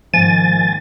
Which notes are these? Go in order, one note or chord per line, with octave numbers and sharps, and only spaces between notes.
G#2 D#3 F3 A#3 G#5 A6